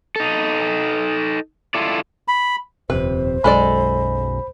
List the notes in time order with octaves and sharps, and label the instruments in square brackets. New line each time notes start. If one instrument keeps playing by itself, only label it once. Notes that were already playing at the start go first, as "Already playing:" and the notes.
[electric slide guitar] D#4 A4
E4 F4 A4 D5
[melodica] B5
[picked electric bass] D#1 F2 C3 [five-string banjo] B4 [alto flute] C5
[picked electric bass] B1 F#2 [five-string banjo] G#3 A4 D5 [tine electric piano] B5